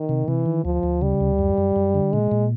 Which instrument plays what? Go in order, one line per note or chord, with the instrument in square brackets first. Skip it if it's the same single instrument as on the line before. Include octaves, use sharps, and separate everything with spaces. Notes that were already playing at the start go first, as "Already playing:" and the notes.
Already playing: [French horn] D#3
[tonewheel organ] C3
[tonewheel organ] C3 [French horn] E3
[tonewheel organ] D#3
[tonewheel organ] D2 [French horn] F3
[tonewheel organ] D2
[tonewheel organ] C#3 [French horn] G3
[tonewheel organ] D2
F#2
F#2
F#2
D3
[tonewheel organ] A#2 [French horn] G#3
[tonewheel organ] A#2